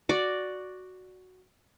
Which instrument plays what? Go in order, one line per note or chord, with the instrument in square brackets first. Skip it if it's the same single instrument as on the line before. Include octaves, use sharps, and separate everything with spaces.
[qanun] F#4 D5